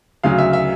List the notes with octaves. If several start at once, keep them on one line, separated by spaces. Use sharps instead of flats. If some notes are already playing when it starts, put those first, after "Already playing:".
D2 C#3 F#3 F5
E5
E5